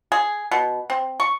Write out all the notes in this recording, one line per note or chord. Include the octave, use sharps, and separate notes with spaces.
G#4
B2
C4
C#6